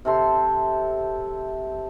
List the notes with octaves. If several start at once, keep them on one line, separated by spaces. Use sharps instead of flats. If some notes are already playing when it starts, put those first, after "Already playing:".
C3 A4 C6